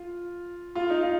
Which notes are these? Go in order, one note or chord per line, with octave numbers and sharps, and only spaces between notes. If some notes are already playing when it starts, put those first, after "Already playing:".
Already playing: F4
F4
D#4
F4